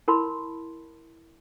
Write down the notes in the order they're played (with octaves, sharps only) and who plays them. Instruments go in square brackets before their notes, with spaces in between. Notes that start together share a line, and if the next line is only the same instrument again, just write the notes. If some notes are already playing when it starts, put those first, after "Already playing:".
[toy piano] E4 A#4 A5 B5 C6